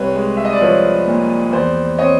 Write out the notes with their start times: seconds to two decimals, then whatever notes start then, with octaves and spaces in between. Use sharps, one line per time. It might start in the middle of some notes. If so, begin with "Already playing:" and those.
Already playing: C2 B4 C#5
0.15 G#3
0.37 E5
0.45 D#5
0.53 D5
0.61 F3 B4 C#5
1.07 A#2
1.52 E2 C5 D5
1.98 C4 C#5 D#5